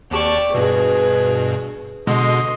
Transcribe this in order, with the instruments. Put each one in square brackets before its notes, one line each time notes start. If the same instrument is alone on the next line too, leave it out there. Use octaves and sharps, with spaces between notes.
[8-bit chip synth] D#2 A5 C#6 [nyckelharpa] G4 D5
[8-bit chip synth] G2 B2 [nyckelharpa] G#4 B4
[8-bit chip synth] B2 D3 G#3 [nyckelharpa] D#5 C6